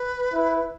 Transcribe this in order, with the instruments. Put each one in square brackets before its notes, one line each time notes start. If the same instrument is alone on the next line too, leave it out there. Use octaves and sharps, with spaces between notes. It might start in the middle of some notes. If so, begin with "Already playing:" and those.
Already playing: [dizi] B4
[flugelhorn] E4